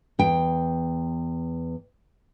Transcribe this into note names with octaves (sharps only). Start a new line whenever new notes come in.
E2 G5